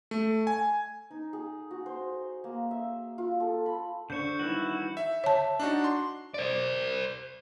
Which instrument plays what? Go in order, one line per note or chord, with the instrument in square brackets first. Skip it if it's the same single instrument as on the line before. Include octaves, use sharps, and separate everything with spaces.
[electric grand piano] A3
G#5
[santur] D#4
G#4
F#4
C5
A#3
E5
F4
A4
B5
[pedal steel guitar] D3 C5 C#6 [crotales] G6 C#7
[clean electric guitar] G2 D#3 E3 [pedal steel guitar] E4 F#4
[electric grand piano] E5
[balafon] C#5 A5
[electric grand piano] D4 D#4 F#4
C6
[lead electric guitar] C5 D5